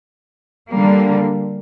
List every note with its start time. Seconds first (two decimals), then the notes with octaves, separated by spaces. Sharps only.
0.73 D3 G3 A#3